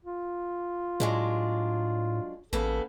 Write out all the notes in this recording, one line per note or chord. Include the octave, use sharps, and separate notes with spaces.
F4
A2 F#3 G#3 D4
A1 C#3 A#3 B3 A4